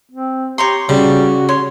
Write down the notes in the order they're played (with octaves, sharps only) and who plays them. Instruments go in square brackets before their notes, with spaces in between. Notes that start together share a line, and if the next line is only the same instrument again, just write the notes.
[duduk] C4
[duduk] G4 [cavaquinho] C#5 A#5 C6
[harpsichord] C#3 [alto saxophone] G3 [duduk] F#4
[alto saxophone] C#5 [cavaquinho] C6